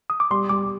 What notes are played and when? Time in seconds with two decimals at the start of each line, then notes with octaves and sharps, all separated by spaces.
0.10 D#6
0.20 D6
0.31 G3 C6
0.49 G3 D6